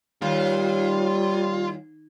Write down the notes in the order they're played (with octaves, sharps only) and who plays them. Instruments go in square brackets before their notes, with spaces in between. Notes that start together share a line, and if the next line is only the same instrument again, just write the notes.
[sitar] D#2 [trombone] G3 [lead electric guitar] F4